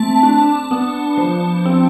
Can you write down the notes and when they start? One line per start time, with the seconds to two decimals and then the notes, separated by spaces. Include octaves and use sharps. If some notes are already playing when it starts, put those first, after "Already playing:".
Already playing: A3 C4 A5
0.23 D4
0.71 B3
1.17 F3
1.66 C4